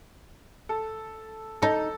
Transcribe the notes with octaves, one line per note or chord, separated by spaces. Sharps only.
A4
D#4 A4